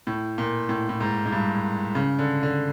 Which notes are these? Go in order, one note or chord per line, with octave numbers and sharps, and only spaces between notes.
A2
A#2
A2
A2
G#2
G#2
G2
C#3
D3
D3